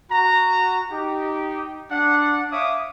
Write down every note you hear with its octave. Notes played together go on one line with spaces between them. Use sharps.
F#4 A#5
D#4 G4
D4 F#5
C#5 E5 F5 D6 D#6